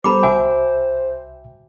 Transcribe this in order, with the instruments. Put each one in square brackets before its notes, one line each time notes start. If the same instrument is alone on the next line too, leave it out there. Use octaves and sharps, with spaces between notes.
[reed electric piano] G3 B3 A4 [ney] C5 [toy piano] A#5 B5 D6
[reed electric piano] C2 E5 G5 [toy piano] F#4 G#5